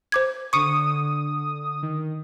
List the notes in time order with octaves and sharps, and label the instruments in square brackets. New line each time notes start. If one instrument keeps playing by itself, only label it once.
[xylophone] C5 D6 G#6
[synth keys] D3 D#6 [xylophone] C#6 C#7
[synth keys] D#3